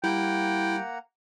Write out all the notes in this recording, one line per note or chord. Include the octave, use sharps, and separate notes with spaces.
G3 A#3 E4 F#5 G5 A#5